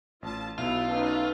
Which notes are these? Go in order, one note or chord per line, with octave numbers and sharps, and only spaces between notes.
A1 F4 A5
B1 B2 E4 F4 B4 E5
C#4 D#4 G4 A4 B4